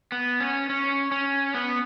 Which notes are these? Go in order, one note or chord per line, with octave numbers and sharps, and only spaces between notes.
B3
C#4
C#4
C#4
B3